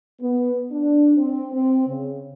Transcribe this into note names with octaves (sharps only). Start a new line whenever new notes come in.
B3
D4
C4
C4
C#3